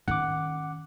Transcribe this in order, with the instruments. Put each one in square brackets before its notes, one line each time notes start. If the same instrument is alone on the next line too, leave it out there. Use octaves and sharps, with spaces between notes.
[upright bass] D#3 C#4 [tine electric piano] F#5 D6